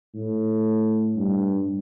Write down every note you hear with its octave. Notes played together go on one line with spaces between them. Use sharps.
A2
G2